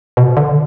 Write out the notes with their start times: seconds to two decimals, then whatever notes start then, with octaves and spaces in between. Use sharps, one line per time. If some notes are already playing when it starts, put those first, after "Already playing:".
0.17 B2
0.37 D3